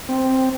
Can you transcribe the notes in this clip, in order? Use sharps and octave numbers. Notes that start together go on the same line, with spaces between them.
C4